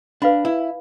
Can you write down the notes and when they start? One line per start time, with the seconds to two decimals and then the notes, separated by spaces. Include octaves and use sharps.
0.22 D4 B4 F5 B5
0.45 E4